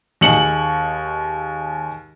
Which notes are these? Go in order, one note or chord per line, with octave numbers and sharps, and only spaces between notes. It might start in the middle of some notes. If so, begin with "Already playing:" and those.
D#2 G#3 C#7 F#7